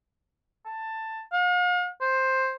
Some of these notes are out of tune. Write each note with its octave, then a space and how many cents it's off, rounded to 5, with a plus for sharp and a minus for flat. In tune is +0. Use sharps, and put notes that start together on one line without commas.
A5 +15
F5 +45
C5 +5